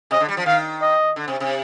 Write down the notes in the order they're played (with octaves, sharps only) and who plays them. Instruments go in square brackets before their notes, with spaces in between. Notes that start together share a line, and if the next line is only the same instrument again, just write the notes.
[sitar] C3 [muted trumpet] D#5
[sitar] D3
G3
F3
[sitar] D#3 [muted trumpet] F5
[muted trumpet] D#5
[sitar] D3
C3
C3